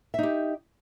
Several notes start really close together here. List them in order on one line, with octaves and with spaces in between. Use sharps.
E5 D#4 G4